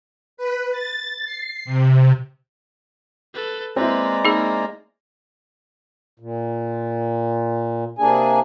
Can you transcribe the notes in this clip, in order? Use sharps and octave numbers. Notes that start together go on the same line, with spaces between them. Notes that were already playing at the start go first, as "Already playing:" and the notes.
B4
A6
C7
C3
A4 B4
G#3 A#3 C4 E4 B4 D5 A#5
A#3 D#4 G#4
A#2
C3 A#3 D4 G#4 G#5